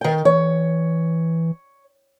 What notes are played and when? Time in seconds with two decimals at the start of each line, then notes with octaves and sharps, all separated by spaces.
0.01 D#3 G5
0.25 E3 C#5